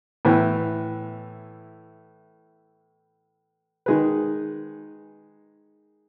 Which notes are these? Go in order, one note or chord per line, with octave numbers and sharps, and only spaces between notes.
A2 E3 B3
D#3 G#3 D#4 G#4 B4